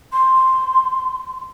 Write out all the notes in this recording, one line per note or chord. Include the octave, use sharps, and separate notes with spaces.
C6